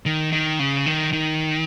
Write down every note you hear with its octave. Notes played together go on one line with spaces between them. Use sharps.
D#3
D#3
C#3
D#3
D#3